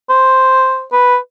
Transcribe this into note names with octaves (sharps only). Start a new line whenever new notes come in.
C5
B4